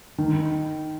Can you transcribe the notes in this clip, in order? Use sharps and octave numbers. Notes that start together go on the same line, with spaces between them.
D#3